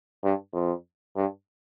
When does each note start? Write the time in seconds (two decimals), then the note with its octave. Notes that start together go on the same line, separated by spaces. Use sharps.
0.24 G2
0.54 F2
1.16 G2